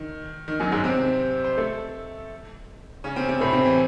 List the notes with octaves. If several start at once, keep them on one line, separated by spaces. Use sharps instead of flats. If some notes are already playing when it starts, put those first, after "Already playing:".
Already playing: D#3
D#3
F#2 F#3
G#2 G#3
C3 C4
C5
A3 A4
C#3 C#4
C3 C4
C3 C4
A2 A3
C3 C4
E3